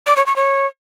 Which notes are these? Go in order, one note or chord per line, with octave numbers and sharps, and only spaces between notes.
D5
C#5
C#6
C#5